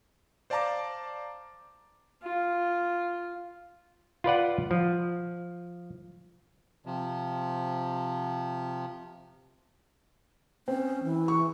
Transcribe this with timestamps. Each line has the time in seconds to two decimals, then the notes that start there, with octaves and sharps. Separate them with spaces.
0.50 C5 D5 F5 A5 A#5 D6
2.23 F4
4.24 F4 B4 D5 F#5
4.71 F3
6.86 C3 F3
10.68 C4 C#4
11.03 E3
11.28 C#6